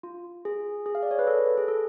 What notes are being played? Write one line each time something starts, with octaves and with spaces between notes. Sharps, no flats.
F4
G#4
G#4
F5
D5
C#5
B4
A4
G#4
A4